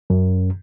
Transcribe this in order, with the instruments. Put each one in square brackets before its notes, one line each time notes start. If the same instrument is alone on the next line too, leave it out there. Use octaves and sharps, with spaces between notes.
[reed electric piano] F#2